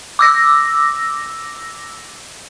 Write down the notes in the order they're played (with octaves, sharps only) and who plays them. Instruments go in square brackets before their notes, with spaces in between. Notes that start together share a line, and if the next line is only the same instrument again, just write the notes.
[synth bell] D6 E6 A#6